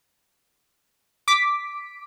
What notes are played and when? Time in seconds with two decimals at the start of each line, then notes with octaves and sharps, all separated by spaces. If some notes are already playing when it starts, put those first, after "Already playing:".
1.28 D6 B6